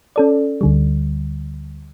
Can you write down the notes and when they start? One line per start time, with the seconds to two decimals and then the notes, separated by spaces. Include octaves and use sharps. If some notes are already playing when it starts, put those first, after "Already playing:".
0.16 C#4 A4 D5
0.61 D2 D3 G3